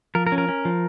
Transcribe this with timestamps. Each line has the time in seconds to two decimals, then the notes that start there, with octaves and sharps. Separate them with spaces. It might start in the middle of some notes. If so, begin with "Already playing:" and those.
0.15 F3 A#4
0.27 A#4
0.32 C#4
0.38 A#4
0.48 C#4
0.65 F3